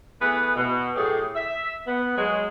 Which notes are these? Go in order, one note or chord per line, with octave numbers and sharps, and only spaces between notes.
E3 A3 B3 G#4 B4
B2
A2 F#3 A3 G4 G#4
E5
B3
F#3 G#3